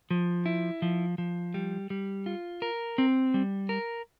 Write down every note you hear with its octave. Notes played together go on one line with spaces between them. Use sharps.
F3
E4
F3
F3
G3
G3
F4
A#4
C4
G3
A#4